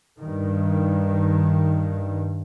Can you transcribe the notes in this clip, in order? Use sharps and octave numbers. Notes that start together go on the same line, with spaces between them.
G2 D#3